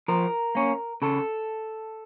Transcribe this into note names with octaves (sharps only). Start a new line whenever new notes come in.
F3 A#4
A#3 C#4
C#3 A4